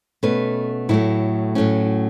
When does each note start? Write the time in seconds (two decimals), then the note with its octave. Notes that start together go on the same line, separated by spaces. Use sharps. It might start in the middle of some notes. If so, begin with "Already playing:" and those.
0.23 B2 A3 C#4 B4
0.89 A2 F#3 A3 E4
1.55 A2 F#3 A3 C#4